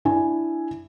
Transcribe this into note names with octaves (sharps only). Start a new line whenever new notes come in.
D4 E4 G#5